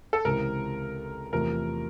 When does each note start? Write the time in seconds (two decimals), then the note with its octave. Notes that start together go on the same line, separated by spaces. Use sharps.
0.13 A4
0.25 C#2 C3 E3 A#4
1.33 E2 C3 F3 A3 A#4